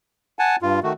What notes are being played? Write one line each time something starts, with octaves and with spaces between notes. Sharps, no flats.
F#5 G#5 A5
G2 F4
D#3 A3 F#4